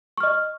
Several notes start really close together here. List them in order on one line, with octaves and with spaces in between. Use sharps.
C#6 F6 D#5